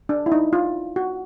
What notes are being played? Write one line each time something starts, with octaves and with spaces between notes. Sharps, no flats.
D4
E4
D#4
F4
F#4